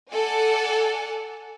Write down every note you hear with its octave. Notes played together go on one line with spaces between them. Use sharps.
A4 D5 F#5 G#5